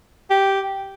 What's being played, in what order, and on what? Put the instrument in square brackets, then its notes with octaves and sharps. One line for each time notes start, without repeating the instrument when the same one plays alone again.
[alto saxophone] G4